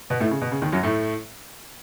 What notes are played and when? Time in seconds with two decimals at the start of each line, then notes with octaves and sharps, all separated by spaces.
0.10 B2 B3
0.20 A2 A3
0.31 C#3
0.42 B2
0.51 C#3
0.62 D#2 D#3
0.72 F#2 F#3
0.83 A2 A3